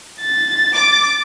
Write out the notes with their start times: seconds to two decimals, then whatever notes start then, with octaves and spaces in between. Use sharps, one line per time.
0.21 A6
0.74 D6